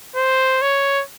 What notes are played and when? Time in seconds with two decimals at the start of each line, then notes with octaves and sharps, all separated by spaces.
0.16 C5
0.62 C#5